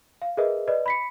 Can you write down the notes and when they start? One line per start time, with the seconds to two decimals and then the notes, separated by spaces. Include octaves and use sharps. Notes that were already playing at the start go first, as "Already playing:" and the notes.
0.22 F5
0.37 G#4 A#4 B4 D#5 E5
0.68 B4 D5 D#5
0.86 B5 B6 C#7